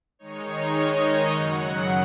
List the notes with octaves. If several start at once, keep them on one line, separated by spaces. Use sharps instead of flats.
D#3 G#3 D#4 C#5
D#5
F#2 C#3 F#3 F#5